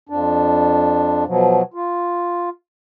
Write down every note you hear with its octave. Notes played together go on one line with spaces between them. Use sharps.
F2 D4
B2 F3 F#3
F4